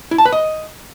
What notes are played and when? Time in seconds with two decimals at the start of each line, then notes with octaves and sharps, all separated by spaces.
0.11 E4
0.18 A5
0.25 B4
0.32 D#5